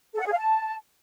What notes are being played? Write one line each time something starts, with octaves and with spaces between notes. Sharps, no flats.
A4
F#5
G#4
F5
A5